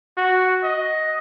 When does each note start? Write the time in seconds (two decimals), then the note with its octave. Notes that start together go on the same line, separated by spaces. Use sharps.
0.17 F#4
0.64 D#5